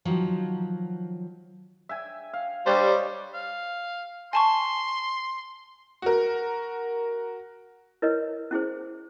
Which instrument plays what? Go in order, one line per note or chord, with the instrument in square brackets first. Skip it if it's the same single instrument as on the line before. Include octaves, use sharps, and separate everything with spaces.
[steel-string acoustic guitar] D#3 F3 F#3
[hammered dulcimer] E5 G5 G#5
F5
[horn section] G3 [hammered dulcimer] D4 C#5 D#5 [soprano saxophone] C5
[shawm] F5
[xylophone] G#5 A5 C#6 [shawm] C6
[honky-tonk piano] F#4 A#4
[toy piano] E4 A#4 B4 C#5 D#5
C#4 E4 G#4 C5